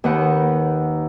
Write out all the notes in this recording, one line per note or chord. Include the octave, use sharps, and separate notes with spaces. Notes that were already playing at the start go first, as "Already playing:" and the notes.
D#2 D#3 B4 F#5